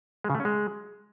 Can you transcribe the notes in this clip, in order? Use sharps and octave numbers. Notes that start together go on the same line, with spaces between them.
G#3
C#3
A3
C#4
G#3